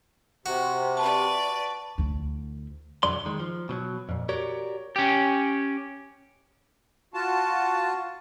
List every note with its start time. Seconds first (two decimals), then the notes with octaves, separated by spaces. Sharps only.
0.46 C3 F#4
0.97 B4 D5 A5 C#6
1.98 D2 E4
3.03 B1 F2 D3 F#3 D5 C6
3.26 D#3 G#3
3.40 F3
3.69 B2 E3 F#3
4.09 F2 A#2
4.29 F#4 G4 A#4 C#5 D5
4.96 C#4 G4
7.14 F4 F#4 A5